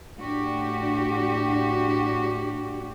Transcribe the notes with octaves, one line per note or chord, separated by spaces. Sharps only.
A2 D4 F#4 G4